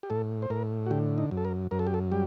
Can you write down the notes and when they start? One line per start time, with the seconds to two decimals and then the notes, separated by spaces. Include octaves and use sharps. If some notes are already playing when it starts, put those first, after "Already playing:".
0.03 G4
0.10 A2 A4
0.42 C5
0.50 A2 A#4
0.86 F#4
0.91 D3 G4
1.18 D#4
1.31 F#2
1.37 A4
1.45 A#4
1.71 F#2 A#4
1.79 A4
1.87 G4
1.94 A4
2.12 G3 G4